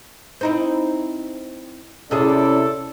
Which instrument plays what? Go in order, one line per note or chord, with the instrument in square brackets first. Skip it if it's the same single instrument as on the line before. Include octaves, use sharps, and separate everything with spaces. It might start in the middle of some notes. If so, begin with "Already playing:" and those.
[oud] C4 D#4 E4
[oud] C3 G#4 [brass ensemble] C#4 E4 D5 [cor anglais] A4